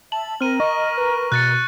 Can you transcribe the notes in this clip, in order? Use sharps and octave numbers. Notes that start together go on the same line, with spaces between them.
E5 A5 F#7
C4 A#4 F6 D#7
D#5 C#6
B4
B2 F#6 A6 C#7